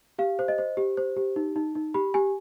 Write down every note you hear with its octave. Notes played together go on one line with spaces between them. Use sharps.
G4 F5
C5
D#5
C5
G4
C5
G4
D#4
D#4
D#4
G4 B5
G4 G#5